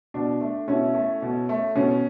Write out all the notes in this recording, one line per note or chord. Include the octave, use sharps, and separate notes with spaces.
B2 D4
A3
B2 C#4 E4
A3
B2
A3
B2 C#4